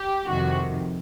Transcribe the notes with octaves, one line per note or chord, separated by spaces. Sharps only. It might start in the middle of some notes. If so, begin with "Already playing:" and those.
Already playing: G4
F2 C3 D#3 F#4